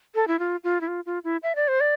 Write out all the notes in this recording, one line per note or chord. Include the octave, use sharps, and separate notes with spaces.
A4
E4
F4
F4
E4
F4
F4
E4
E5
D5
C5
D5